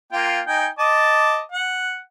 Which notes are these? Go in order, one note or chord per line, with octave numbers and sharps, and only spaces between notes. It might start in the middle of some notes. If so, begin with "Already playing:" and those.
A#3 F4 G5
D#4 G5 G#5
D#5 A5 D6
F#5